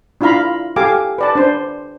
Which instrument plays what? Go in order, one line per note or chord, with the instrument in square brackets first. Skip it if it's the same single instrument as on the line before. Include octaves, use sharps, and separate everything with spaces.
[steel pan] D4 E4 F4 F5 A#5 B5
G4 A4 F5 G#5 D6
B4 D5 A5
D4 C5